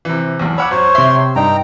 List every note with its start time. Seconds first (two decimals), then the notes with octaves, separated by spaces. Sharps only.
0.05 C3 E3
0.39 B1 E2
0.58 C#5 F#5 B5 D6 E6
0.71 F#2 C5 C#5
0.95 C3 E5 C6
1.36 G2 D#4 G5 A#5